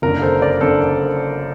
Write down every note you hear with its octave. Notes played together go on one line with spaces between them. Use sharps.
F#1 F#2 D3 A#4
A4 C5
A#4 D5
F#2 D3 A4 C5